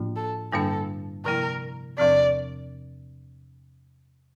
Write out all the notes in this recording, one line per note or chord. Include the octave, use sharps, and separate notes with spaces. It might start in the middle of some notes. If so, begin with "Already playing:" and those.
Already playing: A2 F3 A#3 D4 F4
A4
G2 D3 G3 A#3 D4 A4
C3 F3 A#3 E4 A#4
E2 C3 F3 C4 D5